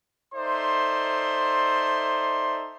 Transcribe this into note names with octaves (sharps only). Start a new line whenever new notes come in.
D#4 A4 C5 D5 E5 C6